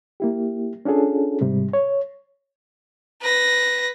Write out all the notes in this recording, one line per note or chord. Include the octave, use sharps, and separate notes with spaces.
A#3 E4 G4
C#4 D4 F4 G#4 A4
G#2 C3 G3
C#5
B4 A#6